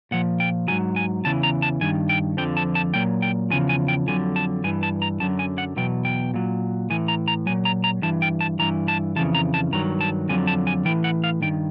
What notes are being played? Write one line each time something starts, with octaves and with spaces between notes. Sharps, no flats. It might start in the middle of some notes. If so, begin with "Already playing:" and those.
A#2 F3 F#5
G5
G#2 D#3 F#3 G#5
G#5
E2 C#3 E3 A5
A#5
A5
G2 D#3 G#5
G5
F2 D3 F3 G5
A5
A5
A#2 F#3 G5
G5
E2 C#3 F3 G#5
G#5
G5
F2 D3 F#3 G#5
A5
G2 E3 G#5
A5
A#5
F#2 D3 F#3 A5
G#5
F#5
E2 B2 F#3 G5
G5
A#2 F#3
A2 E3 G#5
A#5
A#5
A#2 F#3 G#5
A#5
A#5
G2 E3 A5
G5
A5
G2 E3 A#5
A5
F2 C#3 E3 A5
A#5
A5
G2 D#3 F#3 A#5
A5
F2 D3 F#3 G#5
A5
G#5
A2 E3 G5
F#5
F5
G2 D#3 G5